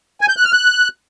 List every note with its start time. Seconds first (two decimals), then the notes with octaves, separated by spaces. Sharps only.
0.21 G#5
0.29 G6
0.37 F#6
0.45 F6
0.53 F#6